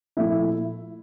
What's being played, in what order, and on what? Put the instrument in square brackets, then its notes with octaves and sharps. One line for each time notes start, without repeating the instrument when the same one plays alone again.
[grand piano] A#2 F3 A3 E4 E5